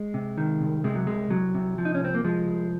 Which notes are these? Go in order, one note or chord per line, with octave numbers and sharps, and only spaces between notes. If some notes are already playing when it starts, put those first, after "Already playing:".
Already playing: G#3
C3
D#3
C2
C3 G#3
F#3
C2 G#3
C2 F#3
C3
F3
D#4
C#4
C2 C4
A#3
F3 G#3
C2